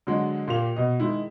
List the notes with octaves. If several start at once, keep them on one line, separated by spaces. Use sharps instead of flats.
D3 F#3 G#3
A#2 A#3 G4 F7
B2 D#5
D#3 G#3 D#4 E4